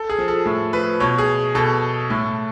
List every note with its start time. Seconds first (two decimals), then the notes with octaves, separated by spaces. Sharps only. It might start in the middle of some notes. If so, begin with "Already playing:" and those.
Already playing: A4
0.10 G#4
0.18 F3
0.28 A4
0.46 A2
0.73 F3 B4
1.00 B2 C#5
1.18 G#4
1.55 B2 A4
2.10 A2